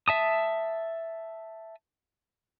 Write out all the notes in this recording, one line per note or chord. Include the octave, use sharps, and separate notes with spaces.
E5 A5 D#6